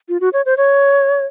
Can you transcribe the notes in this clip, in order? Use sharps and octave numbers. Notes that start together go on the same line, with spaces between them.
F4
F#4
C#5
C5
C#5